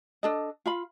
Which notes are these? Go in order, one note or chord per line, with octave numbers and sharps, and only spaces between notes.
D4 A4 D#5
F4 F5 B5